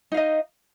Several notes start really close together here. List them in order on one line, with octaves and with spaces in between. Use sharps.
D#4 F5 D#5